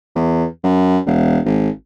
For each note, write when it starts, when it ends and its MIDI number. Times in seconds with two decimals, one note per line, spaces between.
0.16 0.45 40
0.64 0.99 42
1.06 1.40 28
1.45 1.69 32